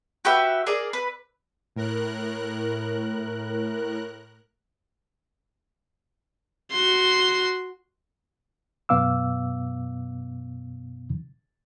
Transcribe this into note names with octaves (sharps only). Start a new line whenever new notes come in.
F#4 G4 B4 E5
G#4 A#4 D5
B4
A2 A#4 F#6
F#4 C6
F#2 B2 B3 F5 D6 E6